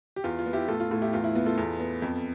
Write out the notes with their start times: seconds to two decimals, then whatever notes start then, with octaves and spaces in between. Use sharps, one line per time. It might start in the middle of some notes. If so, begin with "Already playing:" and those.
0.16 G4
0.24 E2 F4
0.39 F4
0.46 B3
0.53 E4 G4
0.68 A2 F4 A4
0.80 F4
0.91 A2 F4
1.02 E4 G4
1.13 E2 F4
1.24 E4
1.35 B3 F4
1.46 F4 A4
1.58 E2
1.80 B3
2.02 F2